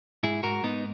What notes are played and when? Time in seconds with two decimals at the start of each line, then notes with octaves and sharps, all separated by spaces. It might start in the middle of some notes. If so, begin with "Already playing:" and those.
0.23 G#2 E4 G#4
0.43 G#2 F#4 A#4
0.63 G#2 B3 D#4